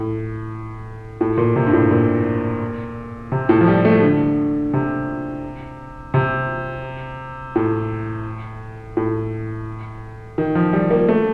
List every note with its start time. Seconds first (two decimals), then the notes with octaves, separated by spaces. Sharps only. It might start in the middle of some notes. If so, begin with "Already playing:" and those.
Already playing: A2
1.21 A2
1.38 A#2
1.56 C3
1.67 G2
1.73 A2
1.91 A#2
3.32 C3
3.49 A2
3.61 F3
3.68 G3
3.85 A3
4.03 D3
4.73 C3
6.14 C3
7.56 A2
8.97 A2
10.38 D#3
10.55 F3
10.73 G3
10.91 A#3
11.08 A3